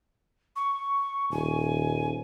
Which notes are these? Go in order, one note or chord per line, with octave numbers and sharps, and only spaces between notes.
C#6
D#1 G#5